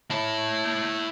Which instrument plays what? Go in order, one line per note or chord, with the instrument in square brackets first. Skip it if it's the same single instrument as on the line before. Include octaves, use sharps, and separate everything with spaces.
[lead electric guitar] E4 A5